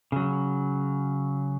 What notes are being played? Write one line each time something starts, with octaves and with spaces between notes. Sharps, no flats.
C#3 F#3